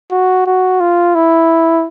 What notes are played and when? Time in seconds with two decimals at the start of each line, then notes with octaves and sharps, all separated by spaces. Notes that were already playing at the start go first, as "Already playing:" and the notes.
0.11 F#4
0.47 F#4
0.80 F4
1.15 E4